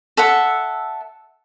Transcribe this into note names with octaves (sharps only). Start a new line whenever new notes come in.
A4 E5 F#5